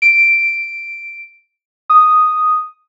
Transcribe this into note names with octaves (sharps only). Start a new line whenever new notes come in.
D7
D#6